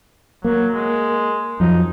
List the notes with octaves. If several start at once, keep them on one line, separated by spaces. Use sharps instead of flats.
F#3 A#3
G#3
F2 F3 F#3 D#4